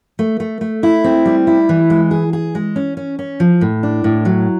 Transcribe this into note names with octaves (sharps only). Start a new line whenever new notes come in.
A3
A3
A3
E4
C4
G3
E4
E3
G#3
G#4
G#4
G#3
C#4
C#4
C#4
F3
A2
D4
A2
F#3